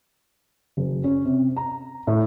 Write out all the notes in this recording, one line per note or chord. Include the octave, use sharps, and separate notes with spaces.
F#1
C#4
C3
A#5
A2